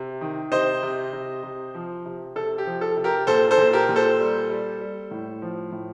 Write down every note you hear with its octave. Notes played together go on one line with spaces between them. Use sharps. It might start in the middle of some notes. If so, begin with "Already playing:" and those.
Already playing: C3
D#3
C3 C5 D#5
C3
C3
C3
F3
C3
C3 A4
G4
F3
A4
C3
G4 A#4
A#2 A4 C5
A4 C5
A#2
G4 A#4
A#2
A4 C5
G3
G3
G3
A2
F3
A2